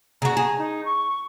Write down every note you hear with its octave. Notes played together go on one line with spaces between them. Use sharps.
C#3 F#4 A#5
G#4
D#4
C#6